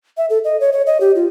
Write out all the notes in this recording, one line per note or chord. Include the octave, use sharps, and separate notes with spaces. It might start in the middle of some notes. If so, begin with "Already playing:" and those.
E5
A4
D#5
C#5
C#5
D#5
G4
F4